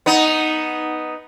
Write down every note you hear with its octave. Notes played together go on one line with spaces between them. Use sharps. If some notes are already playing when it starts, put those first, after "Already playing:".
B3 D#4